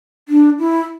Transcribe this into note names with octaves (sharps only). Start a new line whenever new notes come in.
D4
E4